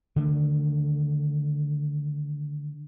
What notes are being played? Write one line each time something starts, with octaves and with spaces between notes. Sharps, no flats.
D3 D#3 A3